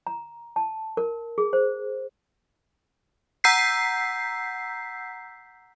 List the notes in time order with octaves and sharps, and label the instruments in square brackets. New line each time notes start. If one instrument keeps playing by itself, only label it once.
[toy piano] A#5
A5
A#4
G#4
C5
[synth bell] F#5 A#5 E6 G6 B6 C7